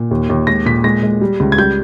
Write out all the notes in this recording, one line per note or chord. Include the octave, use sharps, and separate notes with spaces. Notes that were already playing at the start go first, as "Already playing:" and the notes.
Already playing: A#2
D#2
D#2
G#3 A#6
A#2 B6
G#3 A#6
G#3
G3
C#2
G#6
G3 G6